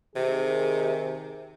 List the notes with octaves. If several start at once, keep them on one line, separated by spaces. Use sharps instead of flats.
C3 D#3 G#4